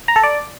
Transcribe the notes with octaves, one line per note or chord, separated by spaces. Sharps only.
A#5
A4
D5